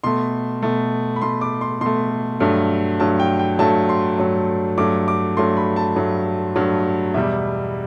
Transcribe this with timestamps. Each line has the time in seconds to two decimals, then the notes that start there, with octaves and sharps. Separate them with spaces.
0.04 B2 A3 C6
0.62 B2 A3
1.16 B5
1.21 B2 A3 C6
1.41 D6
1.61 C6
1.81 B2 A3 C6
2.40 G2 F#3 A3
3.00 G2 F#3 A3 A5
3.20 G5
3.39 G5
3.59 G2 F#3 A3 A5
3.89 C6
4.18 G2 F#3 A3
4.78 G2 F#3 A3 D6
5.08 D6
5.37 G2 F#3 A3 C6
5.57 B5
5.76 A5
5.96 G2 F#3 A3
6.56 G2 F#3 A3
7.14 E2 B2 G3 E5